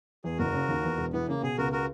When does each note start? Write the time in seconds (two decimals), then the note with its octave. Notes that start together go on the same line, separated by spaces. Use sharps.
0.24 E2 G#4
0.38 F#1 F#4 A#4
0.54 C#3
0.68 D#2
0.83 E2
0.98 E1
1.13 E3 B3
1.28 C#3 A#3
1.43 B2 G#4
1.58 C#2 F#4 A#4
1.72 F#4 A#4